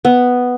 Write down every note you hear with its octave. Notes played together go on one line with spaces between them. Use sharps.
B3